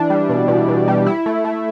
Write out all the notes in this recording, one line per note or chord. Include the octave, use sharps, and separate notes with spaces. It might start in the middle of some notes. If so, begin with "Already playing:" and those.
Already playing: E3 D4
G3
B2
B2
B2
G3
E4
A3
A3